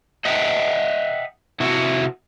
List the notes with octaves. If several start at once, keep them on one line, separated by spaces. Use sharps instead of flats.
D#5 E5 F#5 G5
C3 E4 F#4